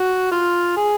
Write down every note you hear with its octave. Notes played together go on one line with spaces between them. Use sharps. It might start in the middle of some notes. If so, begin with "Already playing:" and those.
Already playing: F#4
F4
G#4